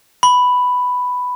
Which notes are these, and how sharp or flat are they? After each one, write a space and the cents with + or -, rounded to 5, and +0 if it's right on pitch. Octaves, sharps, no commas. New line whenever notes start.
B5 +5